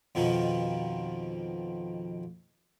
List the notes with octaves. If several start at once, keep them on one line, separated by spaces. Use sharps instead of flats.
F2 B2 D#3 F3